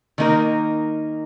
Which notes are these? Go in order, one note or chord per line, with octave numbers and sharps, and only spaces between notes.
D#3 A#3 D#4 A#4